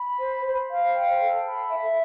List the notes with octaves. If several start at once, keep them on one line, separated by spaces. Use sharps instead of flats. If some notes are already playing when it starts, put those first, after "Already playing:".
Already playing: B5
C5
C5
F5
G5
A4
B5
E5